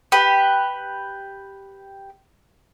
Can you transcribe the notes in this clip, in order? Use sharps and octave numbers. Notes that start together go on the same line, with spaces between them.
G4 B4